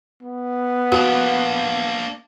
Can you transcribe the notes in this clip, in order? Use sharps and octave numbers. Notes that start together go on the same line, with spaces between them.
B3
A#3 D4 F#4